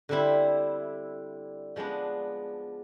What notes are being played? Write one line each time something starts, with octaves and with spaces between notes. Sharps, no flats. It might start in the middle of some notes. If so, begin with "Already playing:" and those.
D3 G3 C4 E4
F3 G#3 B3 D4